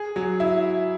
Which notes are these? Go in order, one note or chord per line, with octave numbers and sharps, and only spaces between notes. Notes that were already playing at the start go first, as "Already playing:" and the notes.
Already playing: G#4
F#3
E4